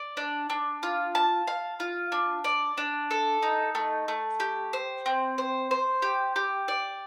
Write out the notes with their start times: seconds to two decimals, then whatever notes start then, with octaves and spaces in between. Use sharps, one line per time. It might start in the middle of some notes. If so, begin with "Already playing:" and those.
Already playing: D5
0.17 D4
0.50 D4
0.83 F4
1.15 A5
1.47 F5
1.80 F4
2.12 D4
2.44 D5
2.78 D4
3.11 A4
3.42 D#4
3.75 A3
4.08 A3
4.40 G4
4.73 C5
5.06 C4
5.38 C5
5.71 C5
6.02 G4
6.36 G4
6.68 D5